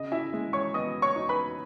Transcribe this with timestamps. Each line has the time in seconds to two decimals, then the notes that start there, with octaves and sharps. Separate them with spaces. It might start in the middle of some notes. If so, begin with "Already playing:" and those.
Already playing: C#3 D#5
0.12 E4 E5
0.34 G#3
0.53 C#5 C#6
0.74 B3 D#5 D#6
1.02 C#5 C#6
1.16 D#4
1.29 B4 B5